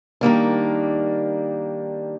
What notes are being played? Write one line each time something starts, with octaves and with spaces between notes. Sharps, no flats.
D#3 G3 A#3 D4